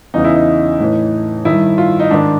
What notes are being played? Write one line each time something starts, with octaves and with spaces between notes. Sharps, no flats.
E2 C#3 E3 D#4
E4
D#4
A2 E3
G2 D#3 E4
F4
D#4
G#2 D#3 D4